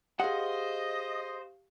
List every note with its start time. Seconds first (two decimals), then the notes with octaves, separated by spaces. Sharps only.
0.20 G4 G#4 C5 D#5 F5 F#5